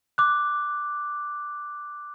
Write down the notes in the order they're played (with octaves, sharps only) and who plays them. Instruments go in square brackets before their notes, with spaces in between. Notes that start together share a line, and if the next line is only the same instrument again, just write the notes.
[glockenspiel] D6 F#6